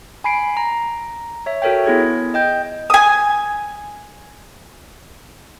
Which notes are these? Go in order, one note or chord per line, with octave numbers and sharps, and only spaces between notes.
G#5 B5 C7 D7
A#5
C#5 E5
F#4 A4 A#4 C#5 E5 G5
B3 E4 G#4 G#6
D#5 G5 G6
G#5 D#6